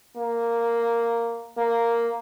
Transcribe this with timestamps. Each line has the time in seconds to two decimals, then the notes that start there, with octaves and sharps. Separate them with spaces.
0.17 A#3
1.57 A#3